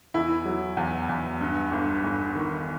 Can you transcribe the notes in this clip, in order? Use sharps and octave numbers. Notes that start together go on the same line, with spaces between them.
E2 E4
F#3
E2
E2
G2
G1
G1
D#3